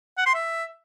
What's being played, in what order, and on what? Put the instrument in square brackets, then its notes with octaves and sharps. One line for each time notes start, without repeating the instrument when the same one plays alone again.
[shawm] F#5
C6
E5